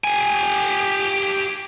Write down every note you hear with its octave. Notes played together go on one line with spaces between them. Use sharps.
G4 G#5